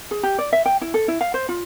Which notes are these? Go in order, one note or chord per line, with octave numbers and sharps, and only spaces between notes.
G#4
G4
D5
E5
G5
E4
A4
E4
F5
C5
F4